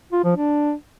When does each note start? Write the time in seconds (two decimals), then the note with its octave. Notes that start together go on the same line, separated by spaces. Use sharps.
0.12 F4
0.24 F3
0.36 D4